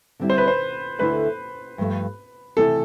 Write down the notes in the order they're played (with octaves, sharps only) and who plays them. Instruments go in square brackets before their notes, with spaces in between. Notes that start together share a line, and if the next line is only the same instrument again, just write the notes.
[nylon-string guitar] D3 G3 C4 E4
[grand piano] C5
B4
C5
[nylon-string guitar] D2 D3 A3 E4 [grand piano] B4
[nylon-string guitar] G2 F3 A3
[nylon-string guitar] C3 E3 A3 E4 [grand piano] A4